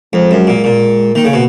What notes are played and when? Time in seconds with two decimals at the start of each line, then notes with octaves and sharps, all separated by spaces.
0.13 F2 G#3
0.31 F#2
0.47 A#2
0.64 A#2
1.15 D#3 A#3
1.25 C#3
1.33 B2